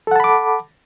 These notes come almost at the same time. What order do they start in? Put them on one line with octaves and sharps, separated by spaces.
A4 F#5 A5 B5 D6